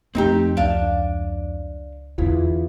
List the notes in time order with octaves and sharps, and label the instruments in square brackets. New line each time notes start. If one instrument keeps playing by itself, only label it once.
[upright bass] F2 [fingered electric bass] A3 [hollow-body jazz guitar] C4 D#4 G4
[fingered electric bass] C#2 [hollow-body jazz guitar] D4 F5
[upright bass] E2 D3 [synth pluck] B3 E4 F4